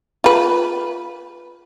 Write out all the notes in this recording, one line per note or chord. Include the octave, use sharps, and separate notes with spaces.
F4 B4